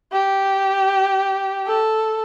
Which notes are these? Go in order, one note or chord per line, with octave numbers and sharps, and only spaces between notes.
G4
A4